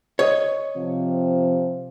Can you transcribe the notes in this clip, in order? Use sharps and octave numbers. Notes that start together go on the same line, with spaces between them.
C#5 D#5
C3 F3 C4